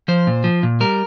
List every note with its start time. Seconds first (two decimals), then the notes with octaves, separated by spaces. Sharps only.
0.08 F3 C5
0.27 A#2
0.44 F3
0.63 A#2
0.80 G3 A#4